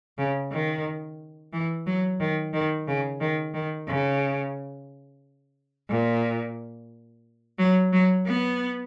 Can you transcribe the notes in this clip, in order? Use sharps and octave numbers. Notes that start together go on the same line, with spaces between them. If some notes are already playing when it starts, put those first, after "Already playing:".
C#3
D#3
E3
F#3
D#3
D#3
C#3
D#3
D#3
C#3
A#2
F#3
F#3
B3